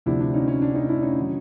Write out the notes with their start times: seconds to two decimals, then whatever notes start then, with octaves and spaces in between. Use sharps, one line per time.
0.06 D2 C3 F3 D4 E4
0.20 D4
0.34 C#4 D#4
0.48 C#4
0.62 D4
0.75 C#4 D#4
0.89 D4 E4
1.02 C#4 D#4
1.19 D#3 F#3